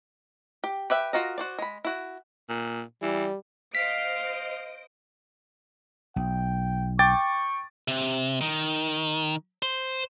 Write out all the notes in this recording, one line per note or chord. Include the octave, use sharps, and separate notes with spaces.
G4
G4 B4 E5 G5
F4 F#4 A#4 D#5
F#4 C5 D5
G#3 B5
E4 F#4
A#2
E3 G3
C5 D#5 F5 B6 D7
B1 G5
G5 C#6 D6 A6
C3
D#3
C5